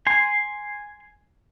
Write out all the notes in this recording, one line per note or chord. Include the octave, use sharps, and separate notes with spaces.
G#5 C6